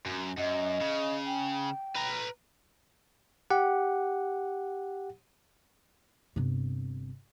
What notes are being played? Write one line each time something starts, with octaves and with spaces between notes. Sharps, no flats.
F#2
F#2 D#5
C#3
G5
B4 A#5
G4 F#5
G1 C3